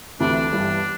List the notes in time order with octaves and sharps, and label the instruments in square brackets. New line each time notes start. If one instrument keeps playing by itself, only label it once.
[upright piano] D2 C3 E3 A3 [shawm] D4
[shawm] D4
[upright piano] G1 G2 E3 G3